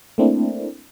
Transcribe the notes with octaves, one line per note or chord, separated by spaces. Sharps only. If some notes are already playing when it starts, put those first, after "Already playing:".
A3 A#3 C4 D4 E4